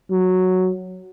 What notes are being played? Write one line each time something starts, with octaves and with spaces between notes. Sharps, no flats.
F#3